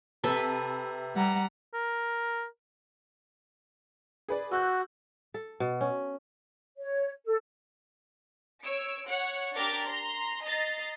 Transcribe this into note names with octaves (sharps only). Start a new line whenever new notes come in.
C3 A4 B4 E5
G3 F#5 A#5
A#4
G#4 B4 D5
F#4 E6 F#6 G6
A4
B2
C#4
C#5
A4
C#5 E6 D7
C#5 F#5
D4 G4 A#4 A#5 D6 A6
A#5 C6
D#5 A#5 A6 C7